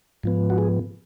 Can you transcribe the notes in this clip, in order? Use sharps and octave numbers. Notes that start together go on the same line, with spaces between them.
G#2 F3 B3
F#4
G#4